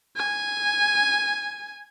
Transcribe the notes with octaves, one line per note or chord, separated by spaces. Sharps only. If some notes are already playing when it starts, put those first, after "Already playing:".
G#5